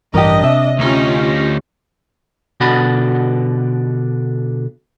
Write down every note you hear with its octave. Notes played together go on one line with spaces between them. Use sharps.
A1 G2 E3 D4 G4 A#4 D#5
C3 E5
D2 C#4 D#4 F4 G4
B2 D3 F#4 D5 F#5 B5